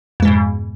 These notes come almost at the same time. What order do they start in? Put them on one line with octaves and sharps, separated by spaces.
F2 G#3 G#2 B2